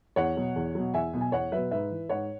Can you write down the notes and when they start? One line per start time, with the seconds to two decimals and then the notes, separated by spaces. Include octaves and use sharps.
0.16 E2 C#5 F#5
0.37 B2 F#3
0.55 E2
0.75 B2 F#3
0.94 E2 E5 G#5
1.13 B2 F#3
1.21 G#5
1.32 E2 C#5 F#5
1.52 B2 F#3 B4 E5
1.71 G#2 B4 E5
1.91 E3
2.10 G#2 C#5 F#5